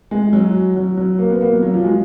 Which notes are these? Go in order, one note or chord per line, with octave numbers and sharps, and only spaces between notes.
G#3
F#3
F#3
F#3
A#3
B3
A#3
F#3
F#3
F3
G#3